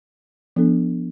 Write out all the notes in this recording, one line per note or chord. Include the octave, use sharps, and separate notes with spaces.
F3 B3 D4 A4